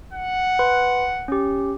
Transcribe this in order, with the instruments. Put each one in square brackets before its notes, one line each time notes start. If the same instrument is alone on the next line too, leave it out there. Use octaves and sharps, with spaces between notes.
[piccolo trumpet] F#5
[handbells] B4 C6
C#4 G4